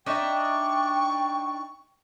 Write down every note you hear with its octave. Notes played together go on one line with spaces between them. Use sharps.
D4 D#4 E5 G5 C#6